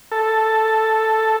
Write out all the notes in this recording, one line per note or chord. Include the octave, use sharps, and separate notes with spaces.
A4